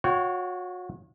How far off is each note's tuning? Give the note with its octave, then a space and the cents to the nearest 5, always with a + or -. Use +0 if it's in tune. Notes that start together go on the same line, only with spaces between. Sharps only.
F#4 -35 C#5 +0 G5 -45